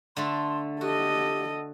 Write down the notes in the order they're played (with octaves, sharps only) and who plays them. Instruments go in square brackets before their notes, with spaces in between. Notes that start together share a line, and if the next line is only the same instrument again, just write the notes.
[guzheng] D3 A3 A4 [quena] C6
[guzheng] F#4 [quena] G4 [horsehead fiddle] A4 D#5